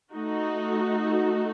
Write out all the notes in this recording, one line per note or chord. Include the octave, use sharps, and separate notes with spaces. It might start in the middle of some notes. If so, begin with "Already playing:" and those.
A3 D#4 F#4